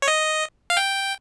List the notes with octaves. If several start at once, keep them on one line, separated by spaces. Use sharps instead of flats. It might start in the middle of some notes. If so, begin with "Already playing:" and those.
C#5
D#5
F5
G5